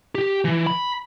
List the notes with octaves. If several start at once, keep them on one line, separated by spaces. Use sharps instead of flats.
G4
E3
B5